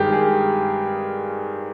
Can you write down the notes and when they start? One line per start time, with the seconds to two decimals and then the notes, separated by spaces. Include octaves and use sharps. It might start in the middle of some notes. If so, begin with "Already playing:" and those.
Already playing: G2 D#3 G#3 G4 G#4 A#4
0.12 G#4